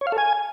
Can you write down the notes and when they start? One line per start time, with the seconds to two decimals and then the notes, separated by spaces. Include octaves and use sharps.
0.01 C#5
0.07 F5
0.12 A4
0.18 G#5